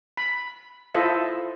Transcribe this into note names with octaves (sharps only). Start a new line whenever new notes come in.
B5
E4 F4 A4 C5 D#5 E5